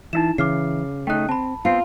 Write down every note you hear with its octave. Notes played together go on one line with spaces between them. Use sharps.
E3 D#4 E4 E5 A5 E7
C#3 E3 D6 F6 C7
A3 D#4 G5 F#6
C4 A5 B5
B3 C4 F4 C5